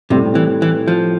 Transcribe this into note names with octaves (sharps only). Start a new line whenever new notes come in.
A2 C3 G3 C4
E3
E3
F3